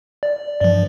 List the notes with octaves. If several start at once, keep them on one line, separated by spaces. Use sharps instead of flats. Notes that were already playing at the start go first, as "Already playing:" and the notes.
D5
G2 F3